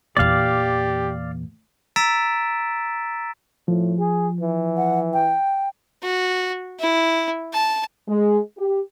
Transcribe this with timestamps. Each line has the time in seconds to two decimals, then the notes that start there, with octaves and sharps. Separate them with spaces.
0.17 E2 A#2 G4 D5 F5
1.96 A#5 E6 A6 B6 D7 E7
3.68 A2 F3
3.99 G#4
4.40 E3
4.77 F#5
5.13 G5
6.03 F#4
6.80 E4
7.53 A5
8.08 G#3
8.58 G4